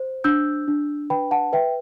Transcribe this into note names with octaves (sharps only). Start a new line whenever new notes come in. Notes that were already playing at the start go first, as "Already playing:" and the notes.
Already playing: C5
D4 E6 G6
D4
B4 G5 B5
F#5 A5
B4 E5 G5